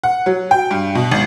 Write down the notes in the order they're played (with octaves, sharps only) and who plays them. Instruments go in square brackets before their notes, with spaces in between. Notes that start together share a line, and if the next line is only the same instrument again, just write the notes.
[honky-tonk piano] F#5
F#3
G5
G2
B2
G#1